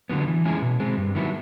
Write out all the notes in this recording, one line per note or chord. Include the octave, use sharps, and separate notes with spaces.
D3 F#3 B3
E3
G#3 C#4 E4 G#4
B2
G#3 C4
G2
D#3 F#3 B3 E4